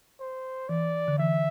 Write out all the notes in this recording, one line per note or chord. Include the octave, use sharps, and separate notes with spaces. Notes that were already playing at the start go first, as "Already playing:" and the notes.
C5
E3 D5
D3
E3 E5